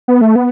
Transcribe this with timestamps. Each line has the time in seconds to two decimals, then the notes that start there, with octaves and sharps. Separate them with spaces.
0.08 B3
0.21 A3
0.36 B3